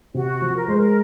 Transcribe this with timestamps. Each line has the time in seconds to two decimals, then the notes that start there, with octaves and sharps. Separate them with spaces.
0.14 C3 F#4
0.42 F3
0.55 A#4
0.67 G#3 C5
0.77 A#4